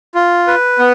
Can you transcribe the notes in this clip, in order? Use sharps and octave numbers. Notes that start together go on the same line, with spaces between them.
F4
B4
B3